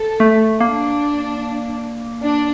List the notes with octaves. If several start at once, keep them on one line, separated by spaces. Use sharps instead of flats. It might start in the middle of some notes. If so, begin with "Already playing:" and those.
Already playing: A4
A3
A#3 D4
D4